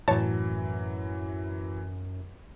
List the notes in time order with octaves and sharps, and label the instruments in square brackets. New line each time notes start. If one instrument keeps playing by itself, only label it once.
[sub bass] F#2 [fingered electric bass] A2 [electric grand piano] E3 F#3 [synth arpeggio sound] C#5 A5